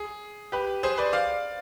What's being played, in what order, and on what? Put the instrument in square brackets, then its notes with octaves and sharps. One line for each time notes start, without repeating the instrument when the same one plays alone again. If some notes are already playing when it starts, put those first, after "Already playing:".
Already playing: [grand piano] G#4
G4 B4
G#4 C5
B4 D5
D5 F5